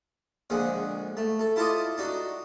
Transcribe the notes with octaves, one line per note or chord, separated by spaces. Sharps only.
A#1 D3 G#3 F#5
A3
A4
E4 F4 A4 C5 D5 D#5
D4 D#4 F#4